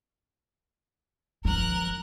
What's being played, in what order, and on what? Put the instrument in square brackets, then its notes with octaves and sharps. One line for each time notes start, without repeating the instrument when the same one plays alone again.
[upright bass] F3 [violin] A#4 F#6